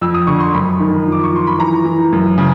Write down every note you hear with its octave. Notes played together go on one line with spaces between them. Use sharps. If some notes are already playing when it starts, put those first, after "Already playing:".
F2 E6
D#6
D3 C#6
C6
F#2 B5
D#3
F3
D6
C#6
F3 C6
B5
E3 A#5
E3
F#2
C#3